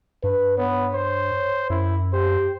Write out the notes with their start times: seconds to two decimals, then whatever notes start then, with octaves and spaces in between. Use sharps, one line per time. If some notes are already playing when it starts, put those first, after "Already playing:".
0.24 G2 B4
0.58 B3 C#5
0.94 C5
1.70 F#2 E4
2.13 G4 C5